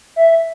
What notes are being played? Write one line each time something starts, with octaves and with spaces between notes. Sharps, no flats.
E5